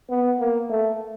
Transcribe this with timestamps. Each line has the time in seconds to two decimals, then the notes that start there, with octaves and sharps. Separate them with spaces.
0.10 B3
0.40 A#3
0.70 A3